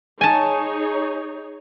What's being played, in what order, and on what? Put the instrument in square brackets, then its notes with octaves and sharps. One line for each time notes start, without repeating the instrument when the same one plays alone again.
[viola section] D#4 G#4 C#5 [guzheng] G#5 A5